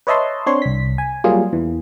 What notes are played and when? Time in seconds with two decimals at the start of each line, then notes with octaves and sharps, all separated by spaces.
0.07 B4 C#5 D#5 E5 A5 C6
0.46 C4 D4 C#5 C6
0.62 C2 B6
0.98 G#5
1.24 F#3 G3 A#3 F4 G#4
1.53 E2 E3